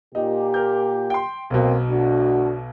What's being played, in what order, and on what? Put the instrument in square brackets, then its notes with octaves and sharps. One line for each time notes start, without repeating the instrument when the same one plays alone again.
[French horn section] A#2 G4 [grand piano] D#4
[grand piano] A#4 G6
G5 C6
[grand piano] B1 B2 [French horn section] A#3 C4
[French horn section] D2 D4 F#4